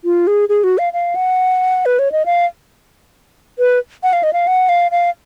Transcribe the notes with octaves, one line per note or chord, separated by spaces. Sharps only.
F4
G#4
G#4
F#4
F5
F5
F#5
B4
C#5
D#5
F5
B4
F#5
F5
D#5
F5
F#5
F5
F5